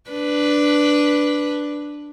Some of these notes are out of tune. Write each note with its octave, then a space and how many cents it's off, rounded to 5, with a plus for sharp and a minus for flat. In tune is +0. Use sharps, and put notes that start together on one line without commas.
D4 +0 B4 +0